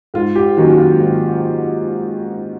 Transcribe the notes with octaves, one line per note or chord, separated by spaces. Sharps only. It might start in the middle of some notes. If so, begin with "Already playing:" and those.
G#2 F4
G4
D#3 F#3 A#3 C#4 F#4
F#4
F4
G#2